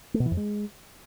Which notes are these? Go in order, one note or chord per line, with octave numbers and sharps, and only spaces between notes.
A3
B2
E3
F2
G#3